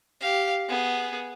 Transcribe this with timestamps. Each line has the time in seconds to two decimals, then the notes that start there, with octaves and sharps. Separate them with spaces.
0.21 G4 F5
0.69 B3 G#4